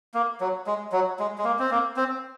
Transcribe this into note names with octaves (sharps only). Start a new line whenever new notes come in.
A#3
F#3
G#3
F#3
G#3
G#3
A#3
C4
A#3
C4